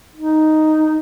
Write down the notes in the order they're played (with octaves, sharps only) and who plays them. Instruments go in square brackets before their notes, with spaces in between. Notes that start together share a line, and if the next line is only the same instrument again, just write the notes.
[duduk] D#4